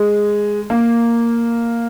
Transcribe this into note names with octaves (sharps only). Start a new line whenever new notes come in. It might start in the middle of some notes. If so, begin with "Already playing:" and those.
Already playing: G#3
A#3